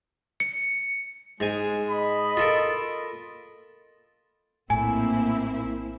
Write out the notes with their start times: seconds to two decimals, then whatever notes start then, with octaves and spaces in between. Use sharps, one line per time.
0.40 C#7
1.40 G#2 G#3 G#5
1.89 D#5 B5
2.37 F4 A4 A#4
4.70 A#1 A2 A#3 C4 E4 G#5